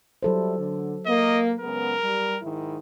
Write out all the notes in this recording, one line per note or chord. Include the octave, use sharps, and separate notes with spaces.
F#3 G3 E4 A4 C5
D3
A#3 D#5
C#3 G#3 B3 A#4
G3
G#2 D#3 E4